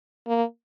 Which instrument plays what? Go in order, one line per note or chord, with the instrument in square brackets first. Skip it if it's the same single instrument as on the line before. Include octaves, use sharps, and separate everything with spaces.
[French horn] A#3